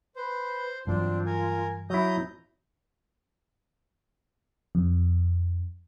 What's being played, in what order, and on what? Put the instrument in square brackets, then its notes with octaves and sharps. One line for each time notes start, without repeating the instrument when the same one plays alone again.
[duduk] B4 [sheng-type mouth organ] C5
[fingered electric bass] G2 E3 F#3 [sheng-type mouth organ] C4 D4 [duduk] F4
[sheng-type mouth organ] A#4 G#5
[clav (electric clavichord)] F#3 E4 [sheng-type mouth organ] A#5 D#6 G6
[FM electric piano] F2